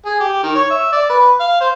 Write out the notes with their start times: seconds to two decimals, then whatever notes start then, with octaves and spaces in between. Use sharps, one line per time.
0.06 G#4
0.20 G4
0.43 D#3
0.55 C#5
0.70 E5
0.92 D5
1.09 B4
1.40 F5
1.61 C5